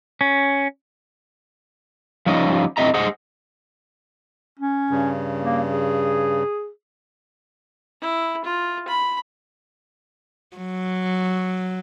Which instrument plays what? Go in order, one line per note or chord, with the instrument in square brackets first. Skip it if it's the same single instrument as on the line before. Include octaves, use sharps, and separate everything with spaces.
[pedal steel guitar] C#4
[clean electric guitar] F3 G3 C#4 D#4 D#5
A2 C4 D#5 E5 A#5
G#4 C5 D#5 F#5
[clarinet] C#4
[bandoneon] G2 C#3
[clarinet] A#3
G#4
[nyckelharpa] E4
F4
B5
[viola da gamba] F#3